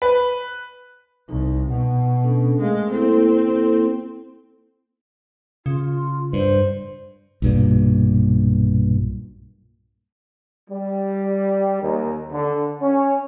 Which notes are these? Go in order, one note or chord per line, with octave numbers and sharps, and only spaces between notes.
B4
C2 D#4
B2 F#5
C#4 D4 A4
G#3 A3 A#4 F5
A#3 C4 E4 A4
C#3 F4
G2 C5
B1 G2 A#2
G3
D#2
D3
C#4